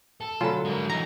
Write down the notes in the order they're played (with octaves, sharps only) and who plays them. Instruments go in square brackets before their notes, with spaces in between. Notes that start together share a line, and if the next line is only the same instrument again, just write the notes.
[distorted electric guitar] A4
[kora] D3 F#3 [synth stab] F4 [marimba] G#5 B5
[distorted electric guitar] G#3 A#4
[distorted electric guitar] E3 D#4 [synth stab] A#5